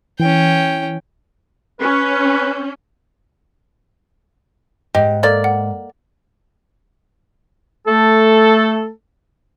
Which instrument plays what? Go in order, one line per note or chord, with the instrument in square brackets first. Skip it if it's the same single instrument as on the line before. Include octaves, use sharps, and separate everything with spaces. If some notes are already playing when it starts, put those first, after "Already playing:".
[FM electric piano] E3 [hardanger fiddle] C#4 G5
[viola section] C#4 [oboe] B4
[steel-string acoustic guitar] G#2 [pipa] G4 [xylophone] D#5
[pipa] A#3 D5 [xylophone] A4
[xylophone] F#5
[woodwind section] A3 A4